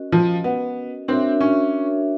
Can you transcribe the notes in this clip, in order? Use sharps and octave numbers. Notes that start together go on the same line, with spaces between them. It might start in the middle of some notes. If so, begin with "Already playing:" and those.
Already playing: C#4 F#4 A#4 D#5
F3
B3
C4 D4 F#4 A#4 C#5 E5
C#4